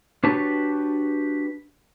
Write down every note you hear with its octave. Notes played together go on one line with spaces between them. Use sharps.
D4 F#4 G4 B4 C#5 A5